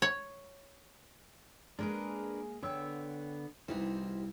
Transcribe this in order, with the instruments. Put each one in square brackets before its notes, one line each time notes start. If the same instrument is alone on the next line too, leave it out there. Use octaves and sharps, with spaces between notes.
[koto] C#5
[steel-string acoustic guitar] G#3 A#3 G#4 [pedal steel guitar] D4 A#4 B4
[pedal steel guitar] D3 B3 E6 [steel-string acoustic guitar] C#5 G5
[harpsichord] C2 E3 [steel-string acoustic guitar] G3 D#4 F#4 [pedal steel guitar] G4 C5